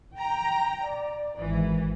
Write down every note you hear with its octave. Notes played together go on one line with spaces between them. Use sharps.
G5 A#5
D5
G#1 E3